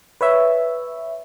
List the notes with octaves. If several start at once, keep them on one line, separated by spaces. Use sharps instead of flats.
B4 C#5 E5